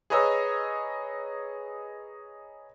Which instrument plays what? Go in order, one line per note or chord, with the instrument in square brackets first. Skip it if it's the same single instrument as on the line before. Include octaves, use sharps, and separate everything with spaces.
[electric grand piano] G#4 B4 C#5 D#5 A#5 E6